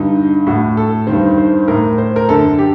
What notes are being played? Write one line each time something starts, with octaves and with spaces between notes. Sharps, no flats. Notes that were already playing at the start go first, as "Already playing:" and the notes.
Already playing: G2 D3 D#4
A2 F#4
A4
G2 D#3 C5
C5
A2 A#4
C5
A#4
F#2 D3 A4
G4